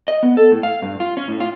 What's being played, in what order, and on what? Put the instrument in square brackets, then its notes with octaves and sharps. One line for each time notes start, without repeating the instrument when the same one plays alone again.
[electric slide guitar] D#5
B3
A4
A2
F5
G2
F4
C#4
A2
F4